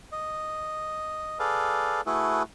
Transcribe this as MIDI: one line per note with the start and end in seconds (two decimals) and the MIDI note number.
0.12 1.38 75
1.39 2.01 68
1.39 2.01 69
1.39 2.01 71
1.39 2.01 74
1.39 2.01 77
2.06 2.43 57
2.06 2.43 64
2.06 2.43 66
2.06 2.43 68
2.06 2.43 69
2.06 2.43 71